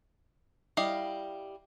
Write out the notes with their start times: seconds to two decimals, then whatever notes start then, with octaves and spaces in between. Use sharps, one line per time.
0.77 G3 E4 D#5 F5